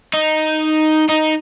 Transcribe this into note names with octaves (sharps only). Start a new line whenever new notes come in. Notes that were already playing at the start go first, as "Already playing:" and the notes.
D#4
D#4